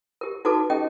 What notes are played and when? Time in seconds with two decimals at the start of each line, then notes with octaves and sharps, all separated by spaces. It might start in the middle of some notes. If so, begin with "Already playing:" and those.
0.21 G4 A#4
0.45 D#4 F#4 A4 B4 A5 D6
0.70 C#4 G4 A4 D#5 G5